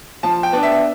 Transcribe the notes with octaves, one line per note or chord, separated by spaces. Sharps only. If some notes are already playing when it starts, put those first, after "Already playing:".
F3 A5
G5
B3 D4
E5